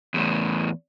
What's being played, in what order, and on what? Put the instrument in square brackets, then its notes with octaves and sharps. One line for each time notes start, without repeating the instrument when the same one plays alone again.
[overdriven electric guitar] E2 A2